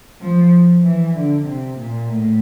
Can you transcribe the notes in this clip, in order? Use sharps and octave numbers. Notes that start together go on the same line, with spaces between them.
F3
E3
D3
C3
A#2
A2